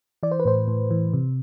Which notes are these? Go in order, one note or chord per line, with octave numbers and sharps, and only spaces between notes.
E3 D5
C5
B4
A2 C5
A2
E3
C3